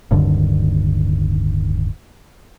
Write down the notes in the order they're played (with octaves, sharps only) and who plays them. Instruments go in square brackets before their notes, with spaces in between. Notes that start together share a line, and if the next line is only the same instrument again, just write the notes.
[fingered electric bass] D1 G2 D3 D#3